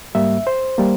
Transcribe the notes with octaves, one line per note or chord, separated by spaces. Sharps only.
G#2 G3 A#3 E5
C5
G3 A#3